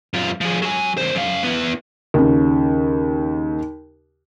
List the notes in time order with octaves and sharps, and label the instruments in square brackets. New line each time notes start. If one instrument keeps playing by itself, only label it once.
[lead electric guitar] F#2 F4
F3 G#4
F#3 G#5
E2 C5
F#2 F5
B3 E4
[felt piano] D#2 C#3